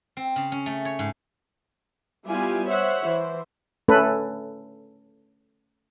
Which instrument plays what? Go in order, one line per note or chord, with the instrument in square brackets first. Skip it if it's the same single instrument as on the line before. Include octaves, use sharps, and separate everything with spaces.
[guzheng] C4
C#3
C#4
A3
C#5
G#2
[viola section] G3 B3 E4 F4 G4 G#5
C5 C#5 E5 F#5
E3 E4 C5
[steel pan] A3 C#4 A4 B4